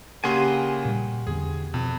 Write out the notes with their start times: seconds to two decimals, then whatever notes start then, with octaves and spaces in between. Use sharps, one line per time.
0.24 C#3 A#3 F#4 G4 G#5 C6
0.85 A#2 G3
1.27 E2 D3 B3 G#4
1.74 F2 B2